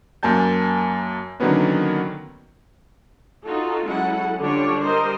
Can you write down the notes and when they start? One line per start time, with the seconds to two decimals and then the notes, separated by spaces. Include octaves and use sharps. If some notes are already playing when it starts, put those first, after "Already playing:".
0.23 F#2 A#3 G#5 A5 G6
1.40 D3 D#3 F#3 A#3 B3 C#4
3.46 D#4 F4 F#4 A4
3.85 F#3 G#3 C#4 E4 A4 F#5
4.38 D3 G3 D4 F4 C#5
4.79 G3 A#4 C5 D#5